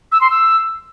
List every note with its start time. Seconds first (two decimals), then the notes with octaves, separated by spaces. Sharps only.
0.12 E6
0.21 C6
0.30 E6